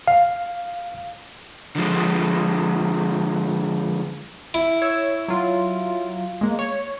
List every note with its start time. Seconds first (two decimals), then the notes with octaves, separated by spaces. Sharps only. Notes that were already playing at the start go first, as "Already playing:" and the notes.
0.08 F5
1.75 D3 F3 G#3
4.54 E4
4.82 C#5 E6
5.28 F#3 F4
6.41 G#3 A#3
6.59 C#5